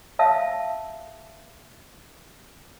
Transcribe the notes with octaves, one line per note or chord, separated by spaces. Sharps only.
E5 F5 A5 E6